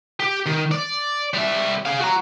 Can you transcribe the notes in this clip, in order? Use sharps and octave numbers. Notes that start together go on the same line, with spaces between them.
G4
D#3
D5
G3 E5
G#4 F5
F#4 A#5